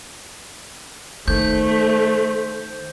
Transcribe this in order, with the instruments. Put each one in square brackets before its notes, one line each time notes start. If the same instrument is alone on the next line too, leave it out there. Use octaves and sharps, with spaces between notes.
[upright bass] D#3 [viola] A3 [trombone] C5 [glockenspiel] G6